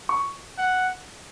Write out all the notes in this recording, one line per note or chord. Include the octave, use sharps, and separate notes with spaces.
C#6
F#5